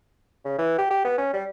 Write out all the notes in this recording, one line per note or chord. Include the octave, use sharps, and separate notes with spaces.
C#3
E3
G4
G4
B3
C#4
G3